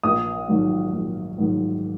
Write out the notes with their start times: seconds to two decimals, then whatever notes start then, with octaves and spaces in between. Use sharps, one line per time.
0.04 A#1 D#6
0.48 G#2 D#3 F#3
0.93 A#1
1.38 G#2 D#3 F#3